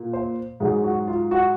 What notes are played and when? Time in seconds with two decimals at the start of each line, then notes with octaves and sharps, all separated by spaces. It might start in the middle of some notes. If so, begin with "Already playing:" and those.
Already playing: A#2
0.13 C5
0.60 G#2 F#3 G#4
0.84 F#4
1.08 F4
1.31 F#4